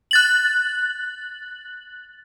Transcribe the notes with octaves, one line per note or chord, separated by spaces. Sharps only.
F#6 A6 F#7